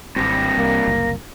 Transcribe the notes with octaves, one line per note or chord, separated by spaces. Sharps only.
G#1 G2 C3 C4 A#6
C2 A#3
F#1 C2